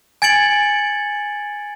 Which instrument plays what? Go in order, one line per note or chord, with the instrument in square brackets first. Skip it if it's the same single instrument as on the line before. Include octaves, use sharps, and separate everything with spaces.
[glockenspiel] G#5 G#6 A6 C#7 D7 F#7